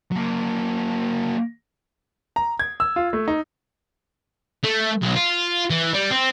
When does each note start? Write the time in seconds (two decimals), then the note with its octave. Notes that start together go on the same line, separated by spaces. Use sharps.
0.12 F#3 A#3
2.36 A#5
2.59 G#6
2.80 E6
2.96 F4
3.13 A3
3.28 D#4
4.64 A3
5.02 B1
5.16 F4
5.70 E3
5.94 G3
6.11 C4